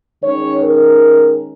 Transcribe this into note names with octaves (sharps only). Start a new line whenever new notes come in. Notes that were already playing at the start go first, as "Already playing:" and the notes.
D#3 G#3 C#4 C#5
A#4